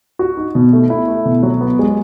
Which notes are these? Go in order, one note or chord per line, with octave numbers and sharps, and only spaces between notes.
F#4
D#4
B2
A3
E4
A3
B2
F#3
B3
G#3